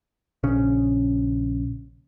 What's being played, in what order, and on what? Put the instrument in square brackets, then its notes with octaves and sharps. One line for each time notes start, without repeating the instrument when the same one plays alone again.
[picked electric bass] A#1 C#3 C#4